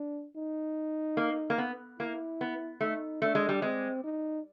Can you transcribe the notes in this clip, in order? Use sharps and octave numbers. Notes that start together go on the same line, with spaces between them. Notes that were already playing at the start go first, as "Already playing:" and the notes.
Already playing: D4
D#4
A#3
A#3
B3
A#3 E4
B3
A3 D#4
A3 D4
G#3
G3
G#3 C4
D#4